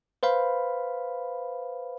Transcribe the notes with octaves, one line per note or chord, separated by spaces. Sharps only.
B4 C5 F5 B5